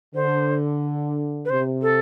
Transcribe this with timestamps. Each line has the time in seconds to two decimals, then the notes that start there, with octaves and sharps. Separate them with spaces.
0.15 D3 C5
1.45 B4
1.50 C3 C5
1.82 A4